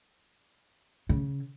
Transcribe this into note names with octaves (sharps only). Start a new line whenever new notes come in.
C#3